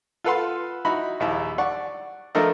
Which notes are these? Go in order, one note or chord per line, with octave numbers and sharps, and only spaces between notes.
F4 A4 B4 F5 F#5 C6
D#4 E4 F#4 B5
A#1 D#2 E4 E5
D5 F#5 C#6
F3 A3 D4 A4 A#4 D#5